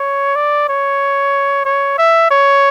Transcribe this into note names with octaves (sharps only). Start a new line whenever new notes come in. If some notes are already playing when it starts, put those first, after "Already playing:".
Already playing: C#5
D5
C#5
C#5
E5
C#5